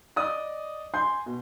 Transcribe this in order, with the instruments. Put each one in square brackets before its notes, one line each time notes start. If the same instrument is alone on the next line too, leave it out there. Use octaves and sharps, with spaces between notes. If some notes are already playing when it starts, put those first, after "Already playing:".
[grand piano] D5 D#5 D#6
G#5 C6 G6
B2